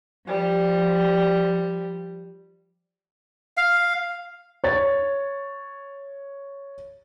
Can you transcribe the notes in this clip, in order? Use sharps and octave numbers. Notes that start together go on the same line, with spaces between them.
F3 G3
F5
C#5 A6